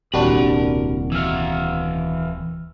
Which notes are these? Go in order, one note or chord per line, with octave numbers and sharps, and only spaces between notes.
D#1 C2 D4 F#4 G4 A#4 B5
E3 F#4 E6 F6